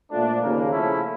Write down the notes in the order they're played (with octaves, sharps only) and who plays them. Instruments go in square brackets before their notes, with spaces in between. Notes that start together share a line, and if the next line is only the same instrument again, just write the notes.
[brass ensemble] A#2 F3 A3 D4
D#2 C#3 F3 A#3
C#3 F3 A3 C#4 E4